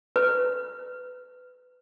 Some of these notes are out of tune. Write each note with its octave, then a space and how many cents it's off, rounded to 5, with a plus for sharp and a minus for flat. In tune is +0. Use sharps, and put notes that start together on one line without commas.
B4 +20